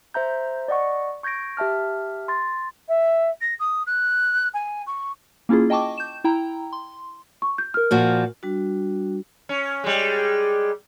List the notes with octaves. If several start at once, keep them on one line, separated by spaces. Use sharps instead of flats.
C5 E5 A#5 G6
D5 D#5 F#5 C#6
C#6 G6 G#6 A#6 D7
G4 E5 A5 F6
C6 A6
E5
A#6
D#6
F#6
G#5
C#6
A#3 C#4 E4 F4 G#4
D#5 G5 A5 C#6 D6
G6 E7
E4 G5 A#5
C6
C#6
G6
A#4 F6
A#2 F3 F#4
G3 D4 F#4
C#4
G3 G#3